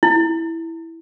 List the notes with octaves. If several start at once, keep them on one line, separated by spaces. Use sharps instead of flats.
E4